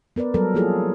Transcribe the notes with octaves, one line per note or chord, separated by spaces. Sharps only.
B3 A#4 B4 D5
F#3 G3 A4 A#4
F3 A#3 E4 F4 G#4 A4